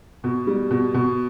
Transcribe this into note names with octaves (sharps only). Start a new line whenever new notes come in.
B2
G3
B2
B2